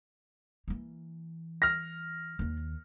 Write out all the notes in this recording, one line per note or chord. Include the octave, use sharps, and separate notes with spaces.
E3 A#3
F6 A#6
D#2 D#3